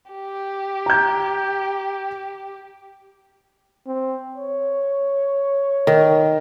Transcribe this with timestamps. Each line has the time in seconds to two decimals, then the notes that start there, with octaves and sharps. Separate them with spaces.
0.12 G4
0.86 A#5 G6
3.87 C4
4.36 C#5
5.87 D#3